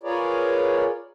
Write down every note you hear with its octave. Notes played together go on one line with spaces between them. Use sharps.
F4 G#4 A#4 B4 C#5 D5